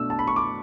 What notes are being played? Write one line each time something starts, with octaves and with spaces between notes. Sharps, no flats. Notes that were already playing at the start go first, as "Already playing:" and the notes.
Already playing: B2 A3 D4 E6
A5
B5
C#6
D6